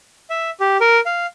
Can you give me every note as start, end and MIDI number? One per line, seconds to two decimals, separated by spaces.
0.30 0.50 76
0.60 0.77 67
0.81 1.01 70
1.06 1.26 77